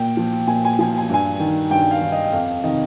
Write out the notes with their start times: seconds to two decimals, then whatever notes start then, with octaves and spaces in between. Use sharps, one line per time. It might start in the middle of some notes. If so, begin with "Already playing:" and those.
Already playing: A#2 G5
0.17 F3
0.47 A#2 G#5
0.65 G#5
0.79 F3 G#5
0.98 G#5
1.09 G2 G#5
1.40 D#3
1.71 G2 G5
1.91 F5
2.02 D#3
2.12 D#5
2.33 F2 F5
2.64 C3 D#3 D#5